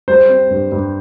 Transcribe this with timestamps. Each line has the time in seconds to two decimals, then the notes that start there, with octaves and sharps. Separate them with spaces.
0.08 G3 C5
0.29 C4
0.50 G2
0.72 G2